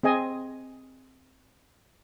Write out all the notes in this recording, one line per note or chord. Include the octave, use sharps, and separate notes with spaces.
C4 G#4 D#5 G#5